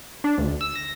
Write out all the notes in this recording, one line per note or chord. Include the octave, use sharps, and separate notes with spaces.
D4
D2
E6
A#6